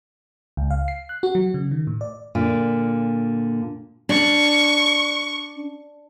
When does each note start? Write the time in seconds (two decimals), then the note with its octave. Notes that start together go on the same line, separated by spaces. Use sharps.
0.57 C#2
0.70 F5
0.88 C7
1.09 F#6
1.23 F#4
1.35 F#3
1.54 C#3
1.71 D#3
1.87 A2
2.01 D5
2.35 A#2 D3
4.09 D4 C#6